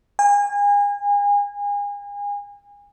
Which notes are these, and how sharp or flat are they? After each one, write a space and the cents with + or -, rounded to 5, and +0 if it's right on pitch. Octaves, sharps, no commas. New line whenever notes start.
G#5 -35